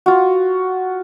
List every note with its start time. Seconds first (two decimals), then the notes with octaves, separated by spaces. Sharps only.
0.06 F4 F#4